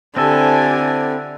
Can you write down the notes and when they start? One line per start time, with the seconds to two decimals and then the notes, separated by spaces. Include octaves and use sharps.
0.17 D3 C4 E4 G4 A4 G#5